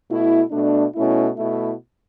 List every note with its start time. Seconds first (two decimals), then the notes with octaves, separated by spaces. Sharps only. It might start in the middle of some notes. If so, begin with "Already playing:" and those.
0.08 B2 A3 E4
0.51 B2 A3 D4
0.94 B2 A3 C#4 E4
1.37 B2 A3 E4